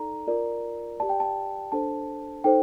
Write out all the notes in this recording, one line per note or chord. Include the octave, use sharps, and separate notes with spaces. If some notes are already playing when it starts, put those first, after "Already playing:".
Already playing: D#4 A4 D5 A#5
F4 A#4 D5
G4 D5 A5
G5
A5
D4 A4 C5 A5
D#4 A4 C5 G5